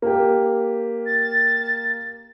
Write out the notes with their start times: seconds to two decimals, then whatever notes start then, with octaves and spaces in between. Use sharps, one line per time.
0.02 A#3 G4
1.06 A6